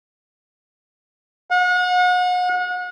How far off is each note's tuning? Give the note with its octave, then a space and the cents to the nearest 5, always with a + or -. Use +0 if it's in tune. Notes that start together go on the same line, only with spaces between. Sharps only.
F#5 -40